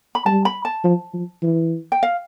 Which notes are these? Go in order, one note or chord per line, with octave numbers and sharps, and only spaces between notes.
B5
G3 A5
B5
A5
F3
F3
E3
G5
F5